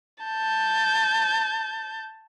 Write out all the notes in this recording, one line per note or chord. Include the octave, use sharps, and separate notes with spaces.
A5 G6